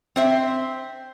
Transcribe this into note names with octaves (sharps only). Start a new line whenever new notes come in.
C4 C5 E5